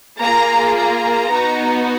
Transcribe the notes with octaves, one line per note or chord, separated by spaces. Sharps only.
A#3 F4 G#4 A#5
A#5
B3 D#4 F#4